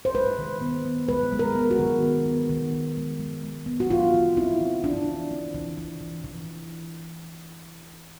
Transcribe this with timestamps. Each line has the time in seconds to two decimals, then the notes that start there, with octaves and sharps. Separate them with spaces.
0.05 C5
0.15 G#3 B4
0.38 D#3
0.61 B3
0.85 B3
1.09 G#3 B4
1.32 G#3
1.39 A#4
1.55 B3
1.71 F#4
1.79 D#3
2.03 B3
2.26 B3
2.49 D#3
2.73 D#3
2.97 G#3
3.20 G#3
3.44 G#3
3.66 B3
3.80 F#4
3.91 E3 F4
4.14 E3
4.37 C4 E4
4.61 E3
4.84 C4 D4
5.07 E3
5.31 C4
5.54 E3
5.77 E3
6.01 E3
6.24 E3